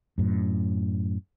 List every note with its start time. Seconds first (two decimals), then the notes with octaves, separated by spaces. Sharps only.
0.18 F#2 A2